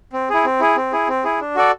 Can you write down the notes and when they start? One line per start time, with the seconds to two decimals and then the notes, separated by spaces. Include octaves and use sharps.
0.13 C4
0.30 E4 G#4
0.45 C4
0.60 E4 G#4
0.76 C4
0.92 E4 G#4
1.08 C4
1.24 E4 G#4
1.40 D4
1.55 F#4 A4 D5